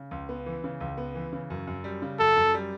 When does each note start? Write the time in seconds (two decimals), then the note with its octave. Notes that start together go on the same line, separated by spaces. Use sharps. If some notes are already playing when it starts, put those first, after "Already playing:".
Already playing: C#3
0.11 C#2
0.29 B3
0.46 E3
0.64 C#3
0.81 C#2
0.98 B3
1.15 E3
1.33 C#3
1.50 F#2
1.67 F#2
1.84 G3
2.02 C#3
2.19 F#2 A4
2.36 F#2
2.54 G3